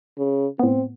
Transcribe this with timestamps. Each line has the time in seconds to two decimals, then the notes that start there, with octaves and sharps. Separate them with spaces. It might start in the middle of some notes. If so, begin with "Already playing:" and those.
0.18 C#3
0.59 A2 B3 C4